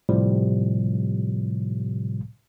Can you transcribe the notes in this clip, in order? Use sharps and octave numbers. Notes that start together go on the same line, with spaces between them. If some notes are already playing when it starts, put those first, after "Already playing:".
A2 C3 F3 G3